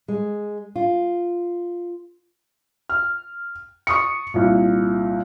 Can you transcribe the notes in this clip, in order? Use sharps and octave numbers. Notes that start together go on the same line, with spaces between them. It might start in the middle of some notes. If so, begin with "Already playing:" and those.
G#3
F4
F6
C#6 D#6 C#7
C2 A#2